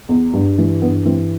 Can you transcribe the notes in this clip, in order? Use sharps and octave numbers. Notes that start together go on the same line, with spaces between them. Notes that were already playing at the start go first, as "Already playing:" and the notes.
E2
G2
E3
G2 B3
E3 C4